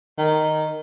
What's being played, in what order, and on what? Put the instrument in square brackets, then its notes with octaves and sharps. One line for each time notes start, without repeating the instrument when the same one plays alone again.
[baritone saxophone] D#3